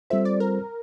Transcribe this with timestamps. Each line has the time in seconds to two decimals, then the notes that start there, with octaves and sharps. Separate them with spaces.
0.10 G3 C4 F4 A4 C5 E5
0.25 D5
0.40 A#4